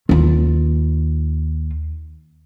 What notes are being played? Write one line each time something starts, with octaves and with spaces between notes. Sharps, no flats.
D#2 F4